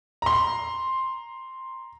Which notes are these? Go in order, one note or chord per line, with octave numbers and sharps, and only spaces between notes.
A#5 C6